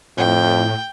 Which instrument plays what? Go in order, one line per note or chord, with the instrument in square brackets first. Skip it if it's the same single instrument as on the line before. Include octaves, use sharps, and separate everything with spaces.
[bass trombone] F2 [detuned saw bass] A2 [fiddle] G5